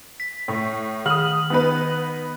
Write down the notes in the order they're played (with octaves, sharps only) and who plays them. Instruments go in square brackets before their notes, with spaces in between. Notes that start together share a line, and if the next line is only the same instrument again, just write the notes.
[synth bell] B6
[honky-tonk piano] A2
[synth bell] D#3 F#7 [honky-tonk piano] D#6 F6
[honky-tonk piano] B3 D#4 B4